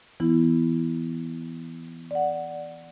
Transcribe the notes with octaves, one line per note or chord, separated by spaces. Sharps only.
E3 B3 E4
D5 F#5